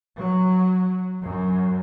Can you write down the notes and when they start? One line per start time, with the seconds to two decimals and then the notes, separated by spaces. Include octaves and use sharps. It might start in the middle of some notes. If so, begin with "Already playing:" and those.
0.19 F#3
1.24 F#2